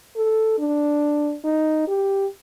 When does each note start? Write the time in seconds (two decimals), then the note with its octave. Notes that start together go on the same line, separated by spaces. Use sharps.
0.16 A4
0.59 D4
1.44 D#4
1.88 G4